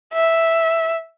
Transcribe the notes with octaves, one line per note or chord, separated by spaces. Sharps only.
E5